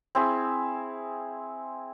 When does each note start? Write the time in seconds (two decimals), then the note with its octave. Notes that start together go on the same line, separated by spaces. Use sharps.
0.15 C4 E4 G#4